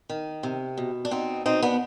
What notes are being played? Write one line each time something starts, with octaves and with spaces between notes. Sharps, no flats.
D#3
C3
B2
D4
B2 C4 D#4
B2 C4 D#4
B3 D4